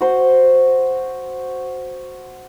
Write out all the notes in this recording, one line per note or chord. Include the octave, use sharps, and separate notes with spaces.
F#4 C5